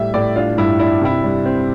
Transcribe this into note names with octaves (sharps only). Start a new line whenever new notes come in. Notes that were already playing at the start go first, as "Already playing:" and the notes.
Already playing: A2 G3 E5
A2 D5
D4 F4
G2 E4
D4 E4
C3 E4
G3
C4